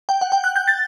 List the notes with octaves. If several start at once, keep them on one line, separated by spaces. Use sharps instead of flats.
G5
F#5
G5
F#6
G6
A6